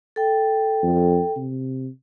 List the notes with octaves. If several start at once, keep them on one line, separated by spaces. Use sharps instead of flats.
A4 G5
F2
C3